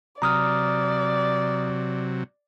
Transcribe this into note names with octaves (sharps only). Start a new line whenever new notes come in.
C3 F#3 D5 A#5 D#6 F6